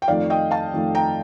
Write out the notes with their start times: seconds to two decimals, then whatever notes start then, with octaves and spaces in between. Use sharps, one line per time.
0.02 G5
0.08 F2 D#3 A3 D5 F5
0.30 D#5 G5
0.51 F5 A5
0.73 F2 D#3 A3
0.95 G5 A#5